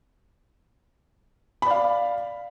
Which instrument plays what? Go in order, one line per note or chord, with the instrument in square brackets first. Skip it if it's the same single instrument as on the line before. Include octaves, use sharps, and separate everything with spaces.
[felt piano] B5
D5
F5